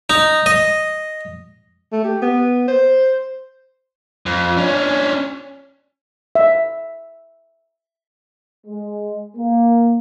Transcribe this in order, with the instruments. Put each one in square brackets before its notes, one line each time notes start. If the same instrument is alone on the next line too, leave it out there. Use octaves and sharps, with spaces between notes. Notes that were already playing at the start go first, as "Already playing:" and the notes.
[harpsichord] D#4
D#5
[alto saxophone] A3
G4
B3
C5
[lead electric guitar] F2
C#4 D4
[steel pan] E5
[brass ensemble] G#3
A#3